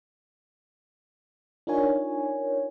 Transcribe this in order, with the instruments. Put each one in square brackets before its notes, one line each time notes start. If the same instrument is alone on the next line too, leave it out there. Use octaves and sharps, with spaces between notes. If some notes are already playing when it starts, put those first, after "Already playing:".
[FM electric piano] D4 D#4 F4 A#4 C#5 G#5